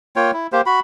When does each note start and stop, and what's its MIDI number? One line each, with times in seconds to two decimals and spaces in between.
0.16 0.31 58
0.16 0.31 65
0.16 0.31 73
0.16 0.31 79
0.33 0.47 64
0.52 0.61 58
0.52 0.61 67
0.52 0.61 72
0.66 0.80 66
0.66 0.80 83